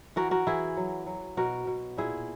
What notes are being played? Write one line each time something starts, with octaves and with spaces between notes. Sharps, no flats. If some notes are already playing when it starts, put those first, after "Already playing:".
E3 F#4 A#4
F#4 A#4
E3 E4 G#4
F#3
F#3
B2 F#4 A#4
B2
A#2 E4 G#4